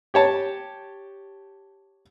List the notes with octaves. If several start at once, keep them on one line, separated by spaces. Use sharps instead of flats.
G4 C#5 A5